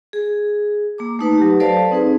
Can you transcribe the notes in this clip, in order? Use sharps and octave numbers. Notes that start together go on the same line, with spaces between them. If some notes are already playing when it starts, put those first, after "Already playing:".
G#4
A#3 A#5 D6
A3 D#4 B4 A5
F#3 G4
A4 B4 C5 D5 F5 A5
C4 D#4 G#4 B4